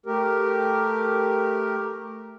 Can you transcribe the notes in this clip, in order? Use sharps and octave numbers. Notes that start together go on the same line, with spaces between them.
A3 G4 A#4